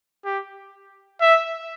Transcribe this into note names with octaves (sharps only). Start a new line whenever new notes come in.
G4
E5